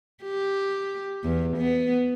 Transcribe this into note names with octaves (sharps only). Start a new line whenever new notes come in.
G4
E2
B3